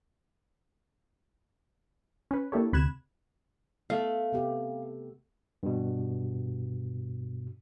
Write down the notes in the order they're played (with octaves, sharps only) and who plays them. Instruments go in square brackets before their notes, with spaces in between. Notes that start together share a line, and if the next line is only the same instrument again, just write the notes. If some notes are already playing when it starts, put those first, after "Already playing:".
[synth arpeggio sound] C#4 B4
A#3 D4 E4 G4 A4 C#5
D2 C3 B5 F#6 G#6 E7
[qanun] A3 [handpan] B3 [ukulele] F5
[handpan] C3 B3 G4
[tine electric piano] G2 B2